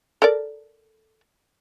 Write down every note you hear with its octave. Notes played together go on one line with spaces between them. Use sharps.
A4 A#4 D5